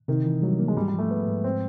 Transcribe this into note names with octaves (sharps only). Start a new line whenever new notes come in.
C3 D#3
E3
F#3 G3
A#3
G#3
G#2 G3
G3
F3 A3
G#3 B3
G#2
C4